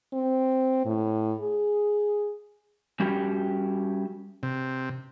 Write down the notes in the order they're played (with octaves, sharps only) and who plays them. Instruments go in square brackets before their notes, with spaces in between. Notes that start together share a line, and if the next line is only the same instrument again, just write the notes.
[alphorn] C4
A2
G#4
[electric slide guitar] G3 C#4 F#4 G4
[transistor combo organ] C3